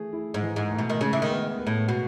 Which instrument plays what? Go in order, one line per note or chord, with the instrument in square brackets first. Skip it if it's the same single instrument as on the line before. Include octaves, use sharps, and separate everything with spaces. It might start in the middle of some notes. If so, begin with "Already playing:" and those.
Already playing: [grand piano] E3 A3 G#4
E4
[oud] G#2
[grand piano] E3
[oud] G#2
[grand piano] A3
[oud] B2
D#3
[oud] C#3 [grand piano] G#3
[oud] E3
D#3
[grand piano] B3
B4
[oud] A2
[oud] B2 [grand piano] F#4